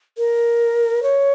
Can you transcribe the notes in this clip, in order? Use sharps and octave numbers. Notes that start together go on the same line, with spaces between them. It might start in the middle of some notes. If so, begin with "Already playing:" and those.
A#4
C#5